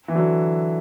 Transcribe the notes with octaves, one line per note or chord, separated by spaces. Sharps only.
E3
D3 F#3